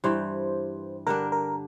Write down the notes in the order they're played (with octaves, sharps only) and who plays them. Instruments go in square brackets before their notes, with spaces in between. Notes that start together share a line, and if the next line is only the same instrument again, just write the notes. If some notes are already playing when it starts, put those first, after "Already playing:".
[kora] G2 E3 G3 [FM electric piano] C5
[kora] D3 G3 D4 [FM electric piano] A#4
[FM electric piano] A#4